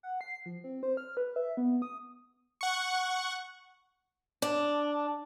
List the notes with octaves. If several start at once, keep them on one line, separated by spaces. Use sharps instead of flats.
F#5
C7
F3
C4
C5
F6
B4
E5
B3
D#6
F#5 C#6
D4